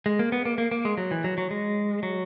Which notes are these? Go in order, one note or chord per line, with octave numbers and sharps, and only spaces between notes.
G#3
A#3
B3
A#3
A#3
A#3
G#3
F#3
E3
F#3
F#3
G#3
F#3